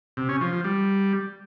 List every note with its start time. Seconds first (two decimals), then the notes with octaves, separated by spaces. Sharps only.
0.17 C3
0.29 C#4
0.41 F3
0.52 F3
0.64 G3